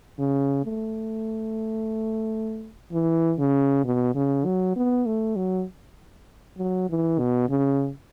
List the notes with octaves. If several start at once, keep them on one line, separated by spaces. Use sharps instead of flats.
C#3
A3
E3
C#3
B2
C#3
F#3
B3
A3
F#3
F#3
E3
B2
C#3